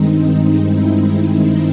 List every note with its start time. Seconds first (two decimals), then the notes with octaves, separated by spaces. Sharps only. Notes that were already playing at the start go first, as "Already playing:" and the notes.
Already playing: G2 D#3 G#3 C4 D#4
0.65 E4